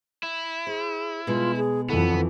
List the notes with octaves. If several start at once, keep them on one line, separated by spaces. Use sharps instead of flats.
E4
G#4 C5
B2 G#3 F4
G#4
F2 E3 B3 A4